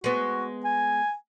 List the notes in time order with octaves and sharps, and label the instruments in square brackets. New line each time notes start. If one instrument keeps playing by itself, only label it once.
[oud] G#3 B3 [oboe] F#4
[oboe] G#5